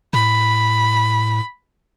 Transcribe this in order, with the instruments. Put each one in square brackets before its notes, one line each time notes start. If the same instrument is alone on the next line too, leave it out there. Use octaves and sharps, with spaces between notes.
[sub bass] A2 [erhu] B5